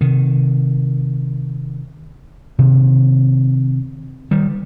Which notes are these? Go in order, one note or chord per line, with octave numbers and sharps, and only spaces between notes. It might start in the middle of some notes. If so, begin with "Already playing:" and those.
C3 D#3
C3 D#3
D#3 G3